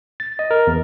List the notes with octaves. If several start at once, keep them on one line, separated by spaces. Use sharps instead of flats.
A6
D#5
A#4
E2